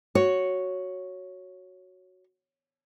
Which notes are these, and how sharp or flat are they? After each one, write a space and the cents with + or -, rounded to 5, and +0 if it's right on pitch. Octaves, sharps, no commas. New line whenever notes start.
F#4 +0 C#5 +0